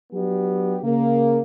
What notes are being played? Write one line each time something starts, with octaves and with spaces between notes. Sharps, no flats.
F#3 B3 D4 G4
C#3 A#3